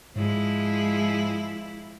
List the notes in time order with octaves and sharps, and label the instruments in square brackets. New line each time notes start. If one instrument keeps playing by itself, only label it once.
[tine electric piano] G#2 [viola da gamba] F3 G#3 E4